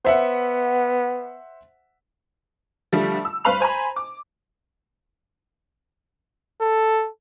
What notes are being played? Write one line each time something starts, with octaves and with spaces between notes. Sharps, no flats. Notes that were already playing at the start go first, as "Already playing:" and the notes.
B3 C5 E5 F#5
D3 F3 G3 A3
E6
G2 B4 C5 F5 B5 F7
C5 G#5 A#5 B5
D6
A4